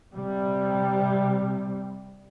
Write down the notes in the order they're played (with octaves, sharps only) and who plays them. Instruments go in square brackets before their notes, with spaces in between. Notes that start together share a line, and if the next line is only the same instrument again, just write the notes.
[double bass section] C3 G3